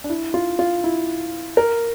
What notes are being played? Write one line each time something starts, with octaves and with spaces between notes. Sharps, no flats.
D4
E4
F4
F4
E4
A#4